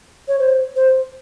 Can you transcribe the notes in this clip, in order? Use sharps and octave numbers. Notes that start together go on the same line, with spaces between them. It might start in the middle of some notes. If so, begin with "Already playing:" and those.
C#5
C5
C5